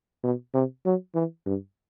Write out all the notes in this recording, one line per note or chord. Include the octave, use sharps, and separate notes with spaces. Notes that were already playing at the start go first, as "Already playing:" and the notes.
B2
C3
F#3
E3
G2